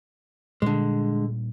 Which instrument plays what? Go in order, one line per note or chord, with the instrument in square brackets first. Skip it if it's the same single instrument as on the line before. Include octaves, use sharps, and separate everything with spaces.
[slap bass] A#2 G3 D4 [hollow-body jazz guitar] D3 G#3